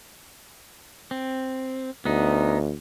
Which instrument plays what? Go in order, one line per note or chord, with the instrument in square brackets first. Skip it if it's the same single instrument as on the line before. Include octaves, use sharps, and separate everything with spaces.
[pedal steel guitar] C4
[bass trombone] D2 [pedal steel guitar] B3 D#4